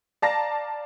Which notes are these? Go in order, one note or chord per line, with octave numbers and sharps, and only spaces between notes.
D5 F5 A5 A#5 A#6